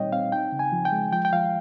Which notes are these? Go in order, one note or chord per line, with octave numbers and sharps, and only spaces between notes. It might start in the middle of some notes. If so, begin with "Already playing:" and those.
Already playing: A#2 G3 C4 D#4 C#5 D#5 G5
C4 F5
D#4 G5
C#3
G#5
F3
G5
G#3
F3 G5
G5
F3 F5